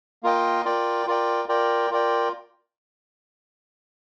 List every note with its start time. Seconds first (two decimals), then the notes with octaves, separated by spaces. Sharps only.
0.23 A#3 F4 A#4 D#5 G5
0.65 F4 A#4 D5 G5
1.07 F4 A#4 D5 G5
1.49 F4 A#4 D5 G5
1.90 F4 A#4 D5 G5